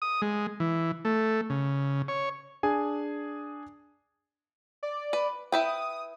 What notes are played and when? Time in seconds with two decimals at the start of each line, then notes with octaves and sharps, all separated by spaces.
0.02 D#6
0.22 G#3
0.60 E3
1.05 A3
1.50 C#3
2.08 C#5
2.63 D4 G#4 G#5
4.83 D5
5.13 B4
5.52 E4 B4 G5 D#6